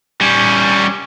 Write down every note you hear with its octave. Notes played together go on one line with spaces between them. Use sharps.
G3 C#4